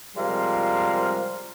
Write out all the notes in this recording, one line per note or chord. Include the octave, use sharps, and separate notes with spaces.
C3 F3 G3 G#3 A#4 F5